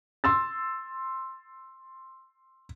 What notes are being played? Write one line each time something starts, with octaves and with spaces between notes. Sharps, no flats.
C6 E6 A6